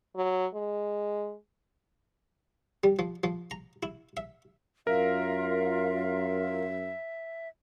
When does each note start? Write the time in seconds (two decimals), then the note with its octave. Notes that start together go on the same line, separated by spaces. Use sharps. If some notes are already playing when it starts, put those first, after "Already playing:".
0.16 F#3
0.55 G#3
2.84 G3
2.99 F3
3.24 F3
3.51 A#5
3.83 E4
4.17 E5
4.87 F#2 F4 A#4 E5 F5